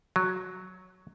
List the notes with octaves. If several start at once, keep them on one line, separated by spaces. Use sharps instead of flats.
F#3